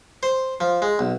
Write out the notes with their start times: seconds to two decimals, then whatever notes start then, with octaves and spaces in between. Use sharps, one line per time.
0.23 C5
0.60 F3
0.82 G#3
0.99 B1